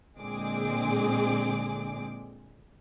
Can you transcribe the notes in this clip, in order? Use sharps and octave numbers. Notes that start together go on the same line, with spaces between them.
A#2 D3 G#3 C4 G#4 D6